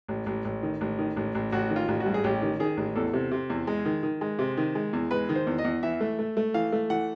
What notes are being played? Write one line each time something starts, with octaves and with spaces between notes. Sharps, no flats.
A1
A1
A1
D#3
A1
D#3
A1
A1
A1 F#4
D#3
F4
A1
F#4
G2
G#4
A1 G4
D#3
D#3 G#4
A1
E2 A4
C3
C3
E2
G#3
D#3
D#3
G#3
C3
D#3
G#3
E2
G#3 B4
D#3
C5
E2
D#5
E2
E3 E5
A3
A3
A3
E3 F5
A3
E3 F#5